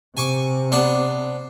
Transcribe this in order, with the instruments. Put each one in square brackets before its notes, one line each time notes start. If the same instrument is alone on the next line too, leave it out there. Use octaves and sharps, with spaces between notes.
[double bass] C3 [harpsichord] G#5 C#6 D6
[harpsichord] B3 D4 C5